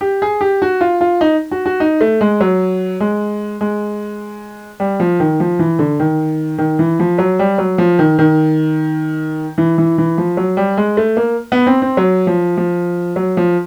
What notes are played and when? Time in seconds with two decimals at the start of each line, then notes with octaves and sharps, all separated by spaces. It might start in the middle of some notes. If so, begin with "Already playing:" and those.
0.01 G4
0.22 G#4
0.41 G4
0.62 F#4
0.81 F4
1.01 F4
1.21 D#4
1.51 F#4
1.66 F#4
1.80 D#4
2.01 A3
2.21 G#3
2.40 F#3
3.00 G#3
3.61 G#3
4.80 G3
5.00 F3
5.20 D#3
5.40 F3
5.59 E3
5.79 D3
6.00 D#3
6.58 D#3
6.79 E3
6.99 F3
7.18 F#3
7.39 G3
7.58 F#3
7.78 F3
7.99 D#3
8.19 D#3
9.58 E3
9.78 E3
9.98 E3
10.18 F3
10.37 F#3
10.57 G3
10.77 G#3
10.97 A3
11.17 A#3
11.52 B3
11.67 C4
11.82 C4
11.97 F#3
12.27 F3
12.57 F3
13.16 F#3
13.37 F3